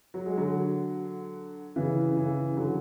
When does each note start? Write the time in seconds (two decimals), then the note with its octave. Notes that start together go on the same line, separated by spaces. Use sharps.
0.14 F#3
0.26 G#3
0.37 D3 F#3
1.76 C#3 E3
2.17 C#3 E3
2.57 D3 F#3